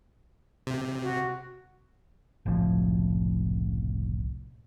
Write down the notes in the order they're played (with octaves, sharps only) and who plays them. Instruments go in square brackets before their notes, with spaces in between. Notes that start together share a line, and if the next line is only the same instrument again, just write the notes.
[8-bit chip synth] C3
[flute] F#4
[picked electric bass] F#1 C2 A2 F3